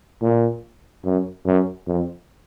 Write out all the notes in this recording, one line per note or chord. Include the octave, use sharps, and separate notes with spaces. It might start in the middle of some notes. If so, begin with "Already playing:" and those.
A#2
F#2
F#2
F2